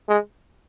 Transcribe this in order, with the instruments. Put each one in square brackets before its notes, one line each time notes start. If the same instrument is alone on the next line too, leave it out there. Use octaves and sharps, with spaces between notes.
[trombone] G#3